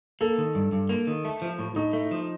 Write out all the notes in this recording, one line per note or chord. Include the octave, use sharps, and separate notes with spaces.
A#3 A4
D#3
G2
G2
A#3
D#3
A3
F3
A2
A2 D#4
A3
F3